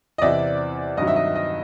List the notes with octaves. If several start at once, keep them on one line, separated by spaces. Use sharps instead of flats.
D#5
E2 C3 E3 D5 E5
G2 D#3 F#3 D#5
E5
D#5
D#5